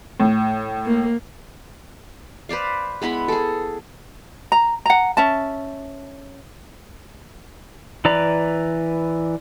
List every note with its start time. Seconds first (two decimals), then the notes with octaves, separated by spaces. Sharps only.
0.20 A2
0.86 A#3
2.49 B4 C5 D5 F5
3.02 G#3 B3 E4 B5
3.28 G#4 A4
4.52 A#5
4.86 F#5 A#5
5.17 C#4 E5 A5
8.05 E3 B4 D5 A#5